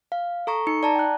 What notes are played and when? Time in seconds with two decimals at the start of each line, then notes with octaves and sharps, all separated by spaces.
0.12 F5
0.47 A4 A#5 C#6
0.67 D#4 C#7
0.83 D5 A5 A#5
0.95 G5 F#6